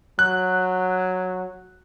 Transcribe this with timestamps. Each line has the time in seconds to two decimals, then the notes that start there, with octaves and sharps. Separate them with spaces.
0.19 F#3 F#6